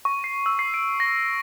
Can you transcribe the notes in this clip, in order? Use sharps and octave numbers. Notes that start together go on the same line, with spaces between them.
C#6
C7
E6
C7
D7
A#6